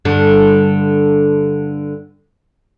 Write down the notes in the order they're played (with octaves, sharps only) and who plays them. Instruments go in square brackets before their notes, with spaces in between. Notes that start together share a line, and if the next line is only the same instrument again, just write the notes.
[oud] G2 D3